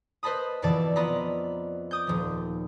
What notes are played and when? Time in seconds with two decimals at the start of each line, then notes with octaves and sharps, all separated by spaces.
0.23 B4 C5 D#5 A5 B5 D#6
0.62 F2 B2 E3 D5 A5 D6
0.96 B3 F4 D5 D#5 A#5 B5
1.91 D6 D#6 G6
2.07 D#1 F3